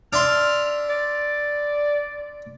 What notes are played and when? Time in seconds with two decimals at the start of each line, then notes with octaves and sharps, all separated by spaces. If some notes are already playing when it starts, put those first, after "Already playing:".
0.13 D4 E5 C6 F6
0.90 D5